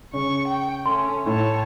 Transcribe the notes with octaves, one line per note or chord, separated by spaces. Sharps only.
C#3 C#6
G5
A3 C#4 C6
A2 C#5 A5